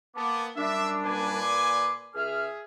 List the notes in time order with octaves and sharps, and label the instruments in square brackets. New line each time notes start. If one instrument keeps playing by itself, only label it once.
[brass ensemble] A#3 B3 [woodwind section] A5 D6
[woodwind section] F#2 G3 D4 [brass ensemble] E5
[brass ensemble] A#2 B4 G#5
[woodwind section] D5 C6 D6
[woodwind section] C#2 E5 F6 [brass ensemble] G#4